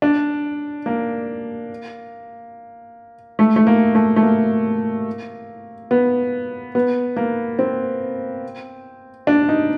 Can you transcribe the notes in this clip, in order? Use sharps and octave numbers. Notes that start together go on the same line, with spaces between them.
D4
A#3
A3
A3
A#3
A3
A3
A#3
B3
B3
A#3
C4
D4
D#4